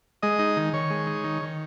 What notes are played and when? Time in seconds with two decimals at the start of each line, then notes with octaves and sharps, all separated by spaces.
0.22 G#3 D#5
0.39 D#4
0.56 D#3
0.73 D#3 C#5
0.90 G#3
1.07 D#4
1.24 D#3
1.42 D#3